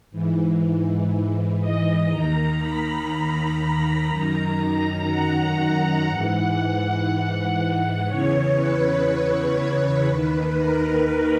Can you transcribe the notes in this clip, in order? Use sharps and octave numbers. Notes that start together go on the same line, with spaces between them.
G#2 E3
D#5
D#2 D#3 A#5
B5
A#5
F#2 D#3 A#5
F#5
G#2 E3
E2 C#3 E3 C#5
B4
D#2 D#3
A#4
B4